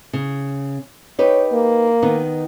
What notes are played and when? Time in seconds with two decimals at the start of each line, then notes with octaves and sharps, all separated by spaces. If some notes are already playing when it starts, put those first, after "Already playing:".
0.13 C#3
1.19 D#4 G4 B4 C#5
1.53 A#3
2.02 D#3 B3 D#4